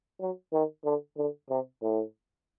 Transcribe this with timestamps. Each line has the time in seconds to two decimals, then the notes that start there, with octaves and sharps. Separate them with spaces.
0.21 F#3
0.53 D#3
0.85 D3
1.17 D3
1.50 C3
1.82 A2